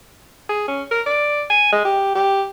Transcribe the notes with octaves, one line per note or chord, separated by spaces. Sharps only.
G#4
C#4
A#4
D5
G#5
G#3
G4
G4